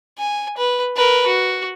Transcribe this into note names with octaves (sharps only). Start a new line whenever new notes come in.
G#5
B4
A#4 B4
F#4